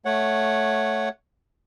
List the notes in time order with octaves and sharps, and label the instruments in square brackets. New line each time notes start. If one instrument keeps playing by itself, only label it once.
[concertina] A3 C#5 F#5